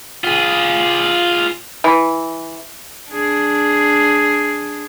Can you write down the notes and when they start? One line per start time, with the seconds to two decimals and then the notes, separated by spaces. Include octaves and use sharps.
0.24 F4 G#4
1.84 E3
3.11 D4 G#4